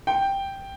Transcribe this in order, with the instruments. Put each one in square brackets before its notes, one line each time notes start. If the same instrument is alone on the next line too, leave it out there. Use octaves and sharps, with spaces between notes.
[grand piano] G5